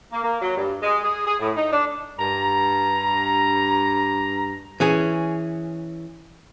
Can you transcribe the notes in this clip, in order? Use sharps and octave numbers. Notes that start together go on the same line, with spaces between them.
A#3
A#3
F#3
G2
G#3
G#4
G#4
A2
D#4
D4
G2 A#5
E3 C#4 G#4